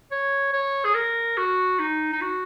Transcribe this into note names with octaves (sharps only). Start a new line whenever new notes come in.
C#5
C#5
G#4
A#4
F#4
D#4
D#4
F#4